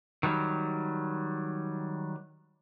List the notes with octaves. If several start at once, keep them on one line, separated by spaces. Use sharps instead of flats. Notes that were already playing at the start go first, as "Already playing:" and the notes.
D#3 F#3 G3